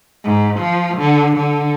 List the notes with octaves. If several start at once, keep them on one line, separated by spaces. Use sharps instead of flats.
G#2
F3
D3
D3